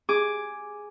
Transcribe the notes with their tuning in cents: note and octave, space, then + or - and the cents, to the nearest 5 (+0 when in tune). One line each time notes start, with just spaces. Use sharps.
G#4 +0 D6 +0